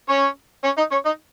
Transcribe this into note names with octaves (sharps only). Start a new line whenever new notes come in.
C#4 C#5
C#4 C#5
D#4 D#5
C#4 C#5
D#4 D#5